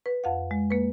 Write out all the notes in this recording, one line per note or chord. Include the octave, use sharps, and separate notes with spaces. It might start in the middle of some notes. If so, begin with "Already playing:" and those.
B4
F2 F5 F#5
G#3
A#3 B4